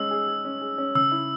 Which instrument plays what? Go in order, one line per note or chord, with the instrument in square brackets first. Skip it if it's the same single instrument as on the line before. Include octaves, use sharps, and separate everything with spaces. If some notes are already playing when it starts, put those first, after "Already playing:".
Already playing: [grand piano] G#3 C#4 [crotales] E6
[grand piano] G#4
G#4
C#4
G#4
C#4
[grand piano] C#3 [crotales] E6
[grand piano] E4